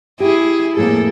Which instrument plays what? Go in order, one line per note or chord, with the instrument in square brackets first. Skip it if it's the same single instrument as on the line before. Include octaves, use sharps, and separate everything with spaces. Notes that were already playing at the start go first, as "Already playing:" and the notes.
[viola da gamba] E4 G#4 [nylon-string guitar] G4
[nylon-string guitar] F2 A2 G#4 [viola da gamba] A#3 A4